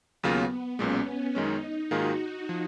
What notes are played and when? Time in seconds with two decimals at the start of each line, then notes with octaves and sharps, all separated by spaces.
0.23 D#2 C#3 F#3 A#3 B3 F4
0.79 B1 A#2 G#3 C#4
1.35 F#2 D#3 G#3 C#4 D#4
1.91 G#2 D#3 A#3 F4 F#4 G#4
2.49 F3